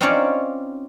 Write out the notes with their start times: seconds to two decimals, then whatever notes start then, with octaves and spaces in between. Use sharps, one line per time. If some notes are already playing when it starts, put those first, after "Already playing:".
0.01 C4 C#4 D#4 F4 C#5 D5